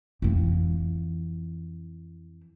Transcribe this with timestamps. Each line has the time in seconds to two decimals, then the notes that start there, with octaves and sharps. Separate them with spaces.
0.22 F2 E3